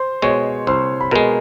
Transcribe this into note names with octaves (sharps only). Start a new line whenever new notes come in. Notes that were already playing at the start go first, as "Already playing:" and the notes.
Already playing: C5 C6
B2 G#3 C#5 C#6
C2 C5 C6
B5
B2 G#3 A#4 A#5